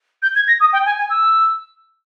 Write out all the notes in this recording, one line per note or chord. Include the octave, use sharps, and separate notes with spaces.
G6
G#6
A#6
D#6
G5
G#5
G#5
E6